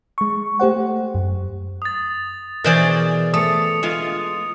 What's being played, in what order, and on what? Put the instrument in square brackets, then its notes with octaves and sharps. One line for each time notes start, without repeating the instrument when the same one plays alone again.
[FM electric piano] G#3 C#6
A3 G4 C5 F#5
F#2
[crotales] D#6 A6
[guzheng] B2 E3 G#4 [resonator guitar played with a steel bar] A#4 C5 D5
[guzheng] A3 [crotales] D#6 C#7
[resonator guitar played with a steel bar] G#3 F4